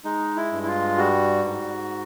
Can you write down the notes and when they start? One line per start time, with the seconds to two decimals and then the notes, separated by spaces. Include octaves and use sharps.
0.05 G#3 D#4
0.36 E4
0.52 G2
0.63 E4
0.67 F4
0.98 G3 F#4
1.44 G#2